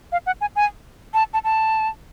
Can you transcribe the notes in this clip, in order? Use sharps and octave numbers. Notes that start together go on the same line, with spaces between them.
F5
F#5
G#5
G#5
A5
A5
A5